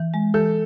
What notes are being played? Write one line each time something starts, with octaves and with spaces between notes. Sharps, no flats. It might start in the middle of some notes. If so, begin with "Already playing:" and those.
Already playing: E3
G#3
E3 A4